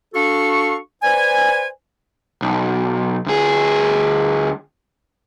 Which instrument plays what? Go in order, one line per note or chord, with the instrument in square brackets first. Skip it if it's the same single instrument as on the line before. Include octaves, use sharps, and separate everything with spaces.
[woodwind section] D4 F#4 A4 F5 C#6
B4 C5 D5 G#5
[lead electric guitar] B1
D2 G#4